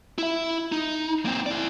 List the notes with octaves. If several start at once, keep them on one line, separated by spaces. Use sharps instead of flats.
E4 E5
D#4
A#3 C4
E4 D5